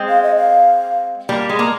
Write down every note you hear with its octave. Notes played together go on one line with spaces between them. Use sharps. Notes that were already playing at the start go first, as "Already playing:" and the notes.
Already playing: G#3 C4
F5
D#5
F5
G3 A#3
G#3
A#3